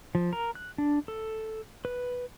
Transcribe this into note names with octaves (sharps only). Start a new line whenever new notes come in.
F3
A#4
F#6
D4
A4
B4